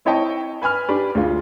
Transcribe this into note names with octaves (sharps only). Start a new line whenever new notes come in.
C4 E4 C#5 D#5 G5 A5
B4 G#5 B5 F6
D4 G4 B4 D5
D2 G#3 F4